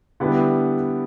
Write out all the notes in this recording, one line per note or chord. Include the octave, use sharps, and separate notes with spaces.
D3 G3 B3 E4 G4